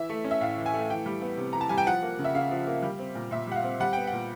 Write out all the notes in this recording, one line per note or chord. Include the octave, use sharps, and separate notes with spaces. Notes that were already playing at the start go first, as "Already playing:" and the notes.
Already playing: E3 E5
A3
C#4
E5
A2 F5
E3
G#5
A3
E3 G5
G3
B3
C3
E3 A#5
A5
G3 G#5
G5
F3 F#5
A#3
C#3
E5
C#3 F5
F3
A#3
G3
C4
A#2
A#2 E5
G3 F#5
F5
C4
G3 F#5
B3 G5
A#2 F#5